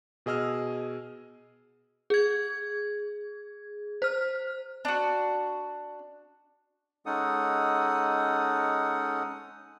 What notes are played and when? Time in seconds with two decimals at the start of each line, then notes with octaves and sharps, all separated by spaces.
0.26 B2 G#4 D#5 E6 F6
2.10 G#4 G#6
4.02 C5 F6
4.85 D4 F#4
7.06 G#3 C#4 D#4 A4 F#5 D#6